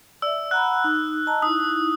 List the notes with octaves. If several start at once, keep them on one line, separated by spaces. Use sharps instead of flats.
D5 E5 E6
F#5 A#5 B5 F#6
D#4
D#5 A5 A#5
D#4 E4 D#6